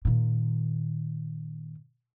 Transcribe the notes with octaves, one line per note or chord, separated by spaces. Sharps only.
A#2 D#3